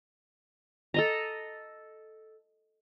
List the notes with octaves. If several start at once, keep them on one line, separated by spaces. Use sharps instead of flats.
A4 D#5 A#5